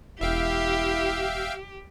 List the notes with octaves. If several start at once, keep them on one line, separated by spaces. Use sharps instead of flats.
E1 E4 G4 E5 F5 G5